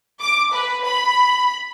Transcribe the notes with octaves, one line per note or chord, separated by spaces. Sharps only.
D6
B4
B5